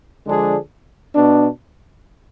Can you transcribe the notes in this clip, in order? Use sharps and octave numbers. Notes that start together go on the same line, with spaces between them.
D3 F3 G#3 D4 G#4
B2 B3 D4